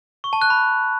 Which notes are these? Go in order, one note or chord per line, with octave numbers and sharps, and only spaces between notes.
C#6
A5
F#6
B5